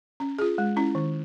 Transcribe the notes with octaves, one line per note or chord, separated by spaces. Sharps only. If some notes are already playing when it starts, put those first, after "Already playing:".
C#4
F4 G#4
G#3
C#4 E4
D#3